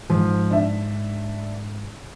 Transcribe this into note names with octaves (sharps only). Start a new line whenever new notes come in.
G#2 F3
D4 E5